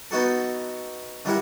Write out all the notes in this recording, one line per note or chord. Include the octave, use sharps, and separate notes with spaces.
B3 D#4 F#4 A4
D3 G3 E4 A#4 F#5